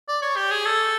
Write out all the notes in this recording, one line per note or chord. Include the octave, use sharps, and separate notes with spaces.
D5
C#5
G4
G#4
A4